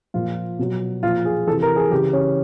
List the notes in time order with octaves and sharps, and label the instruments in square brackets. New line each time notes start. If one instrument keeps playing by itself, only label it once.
[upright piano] A#2 F3 F4
B2 F#3
A#2 F3 F4
G#4
C3 E3 A4
A#4
G#4
C#3 E3 G4
C#4